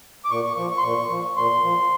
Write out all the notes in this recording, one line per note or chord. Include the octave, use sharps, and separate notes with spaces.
D6
A#2 C#6
C#6
F3 C#6
C#6
C6
A#2 C#6
F3
A#2 C6
F3